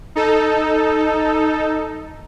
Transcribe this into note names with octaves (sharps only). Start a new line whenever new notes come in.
D#4 A4